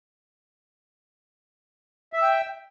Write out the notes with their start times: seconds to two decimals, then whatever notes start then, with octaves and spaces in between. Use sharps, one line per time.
2.13 E5
2.18 E6
2.22 G5